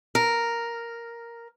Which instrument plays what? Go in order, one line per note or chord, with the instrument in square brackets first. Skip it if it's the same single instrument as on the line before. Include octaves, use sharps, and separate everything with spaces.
[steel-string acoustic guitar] A#4